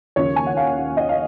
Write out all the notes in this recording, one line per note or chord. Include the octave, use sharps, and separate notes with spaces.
D#2 C#3 F3 C#5
G#5
F#5
F5
D#5
F5